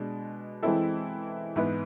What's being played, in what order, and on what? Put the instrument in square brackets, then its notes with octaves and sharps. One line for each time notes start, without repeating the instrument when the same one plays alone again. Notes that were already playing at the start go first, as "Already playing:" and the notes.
Already playing: [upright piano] B2 G#3 D4
E3 G#3 C4 E4 A4
G#2 E3 B3 E4 B4